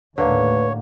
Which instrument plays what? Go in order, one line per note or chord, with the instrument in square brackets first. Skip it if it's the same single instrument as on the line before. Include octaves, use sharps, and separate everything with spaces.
[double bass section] D#2 A2 [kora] D3 A#3 [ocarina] B4 [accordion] C#5